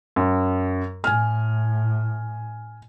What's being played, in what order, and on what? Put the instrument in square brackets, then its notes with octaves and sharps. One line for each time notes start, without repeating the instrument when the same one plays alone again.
[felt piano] F#2
[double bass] A2 [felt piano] G#5 F6